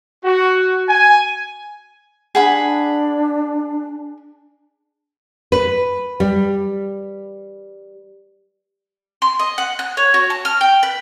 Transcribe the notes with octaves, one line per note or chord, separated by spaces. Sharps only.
F#4
G#5
D4 G#4 F#5 B5
B4
G3
C6
D#5
F#5
F#6
C#5
F#4
A5
F6
G5
B4